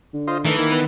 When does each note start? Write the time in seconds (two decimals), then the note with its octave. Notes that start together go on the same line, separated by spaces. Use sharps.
0.14 D3
0.27 F4 C5 D#5
0.45 D#3 E3 A3
0.58 D#3 A#3
0.72 B3 B4